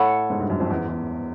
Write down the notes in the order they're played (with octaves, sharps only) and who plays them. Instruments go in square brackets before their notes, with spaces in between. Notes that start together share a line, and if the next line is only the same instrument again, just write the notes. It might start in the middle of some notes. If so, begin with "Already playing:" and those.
Already playing: [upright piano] A2 [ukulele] A4 C#5 F#5 B5
[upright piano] G#2
G2
F#2
F2
E2
E2